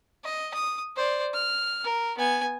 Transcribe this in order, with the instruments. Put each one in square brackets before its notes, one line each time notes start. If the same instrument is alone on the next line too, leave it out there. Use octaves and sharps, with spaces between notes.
[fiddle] D#5
D#6
C5 D5
F6
A#4
B3 G#5